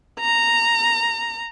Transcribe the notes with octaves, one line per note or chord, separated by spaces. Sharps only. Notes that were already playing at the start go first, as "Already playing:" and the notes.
A#5